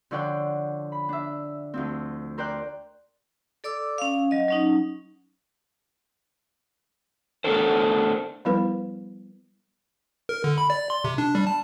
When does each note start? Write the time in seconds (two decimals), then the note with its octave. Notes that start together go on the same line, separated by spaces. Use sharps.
0.11 D3 F3 C#5 D5 F#5 G5
0.92 B5
1.09 D4 E5
1.74 D2 F3 C4
2.38 A#4 C5 D5 G5 F#6
3.64 A4 D5 D6 E6
3.98 C#4 F5
4.31 F#3 D#5
4.48 F#3 C#4 D#4
7.44 A3 B3 D4 A4 A#4 C5
8.45 F3 G3 B3 E4 A#4 B4
10.29 A#4
10.44 D3
10.58 B5
10.70 D5
10.90 C6
11.04 C3
11.18 D4
11.35 G3
11.47 A5